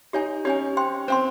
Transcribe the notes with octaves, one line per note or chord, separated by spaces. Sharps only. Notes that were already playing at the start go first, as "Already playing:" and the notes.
D#4 G4 C#5 G#5
C#4 G4 C#5 G#5
C5 G5 C6
C4 C5 G5 C6